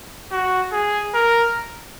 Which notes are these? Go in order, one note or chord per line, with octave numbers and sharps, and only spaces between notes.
F#4
G#4
A#4